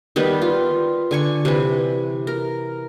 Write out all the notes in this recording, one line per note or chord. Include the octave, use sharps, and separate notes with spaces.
D#3 G3 B3 B4
F4
D3 G#5 C#6
C3 E3 B4
A#4